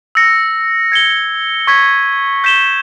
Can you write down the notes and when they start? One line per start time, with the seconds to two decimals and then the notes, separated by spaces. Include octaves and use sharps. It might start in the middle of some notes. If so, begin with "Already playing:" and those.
0.15 E6 A#6 C#7
0.92 G#6 C#7 G7
1.67 C#6 G#6 B6
2.44 G6 B6 E7 G7